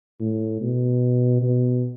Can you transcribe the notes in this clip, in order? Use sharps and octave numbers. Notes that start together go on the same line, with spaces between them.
A2
B2
B2